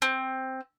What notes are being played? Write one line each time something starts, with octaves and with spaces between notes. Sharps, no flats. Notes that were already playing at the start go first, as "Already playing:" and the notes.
C4